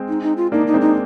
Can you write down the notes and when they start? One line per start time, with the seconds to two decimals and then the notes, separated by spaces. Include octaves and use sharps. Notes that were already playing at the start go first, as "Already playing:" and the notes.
Already playing: G#3 C4
0.08 D#4
0.23 D#4
0.37 F4
0.52 A#3 D4 D#4
0.67 D#4
0.74 G#3 C4
0.81 D#4